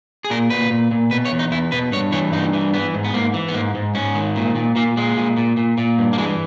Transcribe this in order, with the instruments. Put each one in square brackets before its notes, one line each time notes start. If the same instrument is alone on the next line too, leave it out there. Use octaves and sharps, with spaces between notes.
[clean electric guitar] G#4
A#2 A#4
A#2 B4
A#2
A#2
B2 B4
C#5
E2
D#4
E2 E4
B2 B4
G2 C#5
E3 C#5
G2 D#4
E3
E3 B3
G#2
B3
G#2 A#3
E3
B3
G#2 A#3
G#2
G#2 C#4
D#3
A#2
A#2
A#2 A#3
A#2 G#3
A#2
A#2
A#2
A#2
G2
A#3
E3 G#3